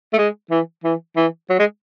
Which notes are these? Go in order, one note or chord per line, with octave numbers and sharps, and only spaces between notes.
A3
G#3
E3
E3
E3
F#3
G#3